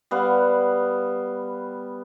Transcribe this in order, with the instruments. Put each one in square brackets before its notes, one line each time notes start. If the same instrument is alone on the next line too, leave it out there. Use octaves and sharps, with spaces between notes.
[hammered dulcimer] G3 B3 F5 F#5